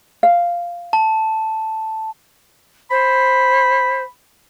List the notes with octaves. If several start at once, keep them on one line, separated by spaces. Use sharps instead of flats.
F5
A5
C5 B5